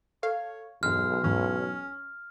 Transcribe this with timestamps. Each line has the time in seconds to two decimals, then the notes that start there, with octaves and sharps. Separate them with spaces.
0.23 A4 C#5 F5
0.83 B1 E2 G2 G#3 F6
1.24 E2 G#2 E3 C#4